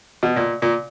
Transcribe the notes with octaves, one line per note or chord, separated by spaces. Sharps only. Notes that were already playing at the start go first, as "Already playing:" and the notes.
B2
A#2
A#2